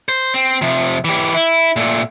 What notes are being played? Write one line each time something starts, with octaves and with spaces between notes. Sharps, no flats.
C5
C4
C3 F3
E3 G4
E4
A#2 A3